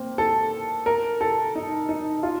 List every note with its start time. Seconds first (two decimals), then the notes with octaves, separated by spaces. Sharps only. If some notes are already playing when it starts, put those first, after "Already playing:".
Already playing: A#3 C4
0.18 A4
0.86 A#4
1.21 A4
1.55 D#4
1.89 D#4
2.23 F4